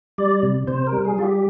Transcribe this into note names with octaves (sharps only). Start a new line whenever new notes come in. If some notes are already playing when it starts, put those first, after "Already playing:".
G3 D5
C3
C3 C5
A#4
G3
G#4
G3 F4
G4